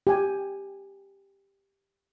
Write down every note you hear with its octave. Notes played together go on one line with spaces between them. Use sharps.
G4 G#5